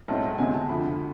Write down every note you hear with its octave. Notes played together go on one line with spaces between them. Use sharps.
B1 A2 G#3 C4 A5
D2 C3 G#3 C4 G#5
A5
F2 D3 F3 B5